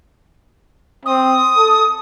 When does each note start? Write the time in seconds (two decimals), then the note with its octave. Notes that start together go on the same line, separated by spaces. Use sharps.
1.05 C4 D#6
1.57 A4